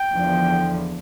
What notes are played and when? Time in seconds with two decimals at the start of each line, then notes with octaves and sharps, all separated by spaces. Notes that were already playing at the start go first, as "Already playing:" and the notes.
Already playing: G5
0.13 E2 D3 F3